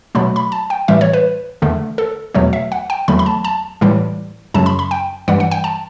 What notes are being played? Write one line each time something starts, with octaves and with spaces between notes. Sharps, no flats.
B2 F#3 A3 B5
B5
A5
G5
A2 E3 G3 E5
C#5
B4
E2 D3 A3
A4
E2 B2 F#3 A3 C#5
E5
F#5
G5
E2 D3 F#3 A3 B5
B5
A5
A5
A2 E3 G3
F#2 C#3 F#3 A5
B5
B5
G5
G2 E3 G3 F#5
F#5
G5
A5